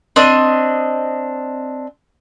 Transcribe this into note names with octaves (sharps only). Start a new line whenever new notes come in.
C4 D4 D#5